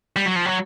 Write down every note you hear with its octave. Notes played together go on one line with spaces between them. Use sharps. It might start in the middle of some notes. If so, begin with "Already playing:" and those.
G3
F#3
F3
F#3